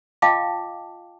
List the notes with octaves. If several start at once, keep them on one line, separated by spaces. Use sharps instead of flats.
F4 D#5 F5 G5 A5 D6